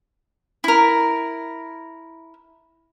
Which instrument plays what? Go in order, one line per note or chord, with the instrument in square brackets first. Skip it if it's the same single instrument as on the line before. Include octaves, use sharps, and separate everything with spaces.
[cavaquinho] E4 A#4